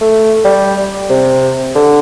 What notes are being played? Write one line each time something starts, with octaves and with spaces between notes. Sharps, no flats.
A3
G3
C3
D3